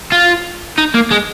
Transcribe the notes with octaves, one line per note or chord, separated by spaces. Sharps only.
F4
D#4
A#3
G#3